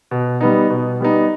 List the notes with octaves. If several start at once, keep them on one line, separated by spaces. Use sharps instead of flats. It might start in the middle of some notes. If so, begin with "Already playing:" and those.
B2
G3 B3 D#4
B2
G3 B3 D#4